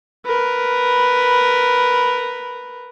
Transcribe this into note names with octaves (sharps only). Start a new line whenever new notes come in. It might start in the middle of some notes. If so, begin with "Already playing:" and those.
A#4 B4